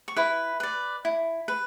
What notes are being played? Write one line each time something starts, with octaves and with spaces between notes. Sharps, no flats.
C#6
E4 B4 B5
B4 D5
E4
B4